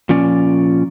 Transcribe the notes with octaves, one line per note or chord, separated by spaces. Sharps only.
A#2 F3 C#4 D5